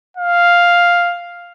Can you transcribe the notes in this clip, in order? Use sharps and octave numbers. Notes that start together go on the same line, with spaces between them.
F5